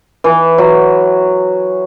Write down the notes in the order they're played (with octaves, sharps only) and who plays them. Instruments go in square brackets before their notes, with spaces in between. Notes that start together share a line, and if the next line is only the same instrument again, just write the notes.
[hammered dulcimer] E3
F#3